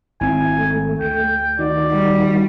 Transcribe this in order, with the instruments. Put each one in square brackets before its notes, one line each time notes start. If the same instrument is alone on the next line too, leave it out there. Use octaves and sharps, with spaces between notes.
[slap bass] G#1 C4 [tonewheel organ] E4 [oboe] G#5
[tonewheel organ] A3
[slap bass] D2 [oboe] G5
[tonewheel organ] D#3 D#4 F#4 [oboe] D5
[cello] G3